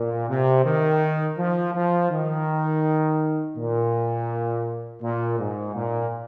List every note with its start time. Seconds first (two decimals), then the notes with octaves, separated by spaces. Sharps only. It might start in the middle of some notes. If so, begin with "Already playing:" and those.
Already playing: A#2
0.29 C3
0.65 D#3
1.38 F3
1.75 F3
2.11 D#3
3.57 A#2
5.02 A#2
5.39 G#2
5.75 A#2